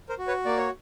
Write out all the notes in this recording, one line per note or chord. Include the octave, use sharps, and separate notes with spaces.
A#4 C5
F#4
B4 C#5
A#3 D5
C#5